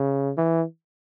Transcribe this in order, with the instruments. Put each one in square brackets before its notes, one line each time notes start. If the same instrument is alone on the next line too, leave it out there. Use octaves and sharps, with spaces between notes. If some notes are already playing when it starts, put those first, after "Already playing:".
Already playing: [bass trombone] C#3
E3